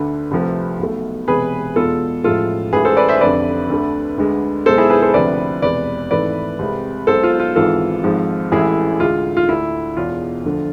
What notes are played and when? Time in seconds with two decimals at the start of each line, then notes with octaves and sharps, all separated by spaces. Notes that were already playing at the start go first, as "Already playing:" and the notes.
Already playing: D2 D3 A3 B4
0.31 C2 C3 F3 A3
0.80 B1 B2 A3
1.28 E1 E2 C3 G#3 G#4 B4
1.76 E2 B2 G#3 F4 A4
2.24 A1 A2 F3 G#3 F4 A4
2.73 A1 A2 G#3 G#4 B4
2.85 A4 C5
2.97 B4 D5
3.09 C5 E5
3.21 F1 F2 D3 B4 D5
3.69 D2 D3 A3
4.18 D2 D3 G#3
4.66 B1 B2 G#3 A4 C5
4.78 E4 G#4
4.90 G#4 B4
5.02 A4 C5
5.14 D2 C3 F3 B4 D5
5.62 E1 E2 C3 G#3 B4 D5
6.10 G#1 G#2 E3 A3 B4 D5
6.59 C2 C3 G#3
7.07 B1 B2 G#3 A4 C5
7.23 F4
7.40 F4
7.55 G#1 G#2 E3 G#3 F4 A4
8.04 G#1 G#2 F3 G#3
8.52 A1 A2 E3 G#3 E4 G#4
9.00 D2 D3 G#3 F4
9.37 F4
9.48 D2 D3 A3 E4
9.97 E1 E2 B2 F4
10.45 D2 D3 F3